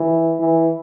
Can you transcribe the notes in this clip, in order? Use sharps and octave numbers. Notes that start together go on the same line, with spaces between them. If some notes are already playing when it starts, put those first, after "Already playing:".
Already playing: E3
E3